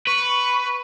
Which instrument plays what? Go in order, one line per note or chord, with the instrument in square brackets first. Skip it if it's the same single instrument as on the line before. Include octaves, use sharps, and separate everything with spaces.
[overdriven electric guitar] B4 [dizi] C#6